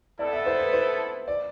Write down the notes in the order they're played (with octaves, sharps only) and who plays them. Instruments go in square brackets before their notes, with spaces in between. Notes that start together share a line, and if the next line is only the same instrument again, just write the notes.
[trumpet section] B3 E4 A4 [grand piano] D5
[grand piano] E5
C5
B4
C5
D5